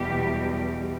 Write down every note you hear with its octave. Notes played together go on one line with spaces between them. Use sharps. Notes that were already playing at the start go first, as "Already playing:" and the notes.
Already playing: E2 B2 G3 G4